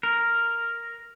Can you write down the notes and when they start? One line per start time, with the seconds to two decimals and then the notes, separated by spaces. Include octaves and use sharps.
0.03 A#4